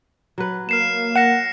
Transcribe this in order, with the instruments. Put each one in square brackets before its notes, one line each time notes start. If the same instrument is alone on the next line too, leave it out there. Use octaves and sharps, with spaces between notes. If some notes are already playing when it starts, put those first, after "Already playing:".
[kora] F#3 B4
[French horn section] A#3 [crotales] F6 C7 E7
[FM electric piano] F#5 [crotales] A#6 C#7 E7